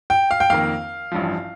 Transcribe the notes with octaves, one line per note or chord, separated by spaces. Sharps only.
G5
F5
G5
F2 D#3 A#3 F5
A1 G2 F3